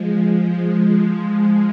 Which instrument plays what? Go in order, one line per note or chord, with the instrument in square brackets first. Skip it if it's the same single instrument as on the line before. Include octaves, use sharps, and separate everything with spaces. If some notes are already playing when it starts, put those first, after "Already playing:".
Already playing: [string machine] F3 G#3